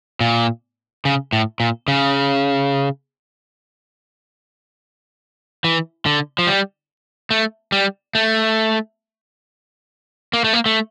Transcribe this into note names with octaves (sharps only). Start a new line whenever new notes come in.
A#2
C#3
A2
A#2
C#3
E3
D3
F3
G3
A3
G3
A3
A#3
A3
A#3
A3